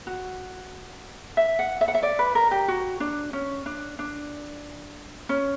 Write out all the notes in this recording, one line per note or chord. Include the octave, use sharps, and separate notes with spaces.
F#4
E5
F#5
E5
F#5
E5
D5
B4
A#4
G4
F#4
D4
C#4
D4
D4
C#4